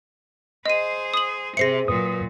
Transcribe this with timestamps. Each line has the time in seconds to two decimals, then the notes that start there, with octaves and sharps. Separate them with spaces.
0.66 G#4 C5 D#5 D#7
1.14 D#6 F#7
1.57 C3 G#4 C5 E5 A#6 C7 C#7
1.88 A#2 F#3 B4 D#6